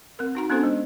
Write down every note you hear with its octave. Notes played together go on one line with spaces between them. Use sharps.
C4 A#4
D#4 F#4 A#5
B3 C#4 D4 F#4 A4 C5
G#3